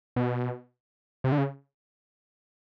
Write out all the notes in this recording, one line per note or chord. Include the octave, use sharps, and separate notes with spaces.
B2
C3
D3
C#3